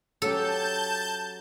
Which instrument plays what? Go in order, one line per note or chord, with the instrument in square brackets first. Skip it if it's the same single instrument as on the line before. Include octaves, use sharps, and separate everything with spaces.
[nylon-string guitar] F#3 C#4 G4 [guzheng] A4 [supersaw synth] A5 G6